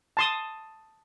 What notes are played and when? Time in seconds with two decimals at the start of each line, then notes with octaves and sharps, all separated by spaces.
0.17 A5 C6 D#6